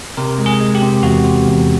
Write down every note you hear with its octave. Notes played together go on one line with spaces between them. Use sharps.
C3 A#4
G#3
G#4
G#3
G4
C3
E2 F#4
C3
E2